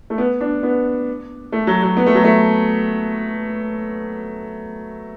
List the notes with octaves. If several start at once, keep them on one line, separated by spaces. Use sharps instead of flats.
A3
B3
D4
B3
A3
F#3
F#3
B3
A3
F#3
A3